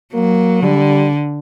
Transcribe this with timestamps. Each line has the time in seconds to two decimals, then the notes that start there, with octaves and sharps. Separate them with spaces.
0.14 F#3 A#3
0.63 D3 G3